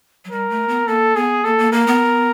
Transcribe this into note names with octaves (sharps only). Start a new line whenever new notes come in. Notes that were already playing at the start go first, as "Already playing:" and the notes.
F#3
G3 A#4
A3
B3
A#3 A4
B3 G#4
A#3 A4
A#3
A#3 A#4
B3